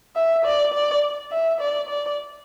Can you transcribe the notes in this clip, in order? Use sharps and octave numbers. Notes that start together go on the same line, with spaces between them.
E5
D5
D5
E5
D5
D5